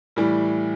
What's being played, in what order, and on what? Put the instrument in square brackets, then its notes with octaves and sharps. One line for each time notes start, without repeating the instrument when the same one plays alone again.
[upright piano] A2 E3 G3